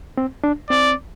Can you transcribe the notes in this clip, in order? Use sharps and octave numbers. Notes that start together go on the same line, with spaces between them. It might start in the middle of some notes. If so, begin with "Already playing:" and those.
C4
D4
C4 D5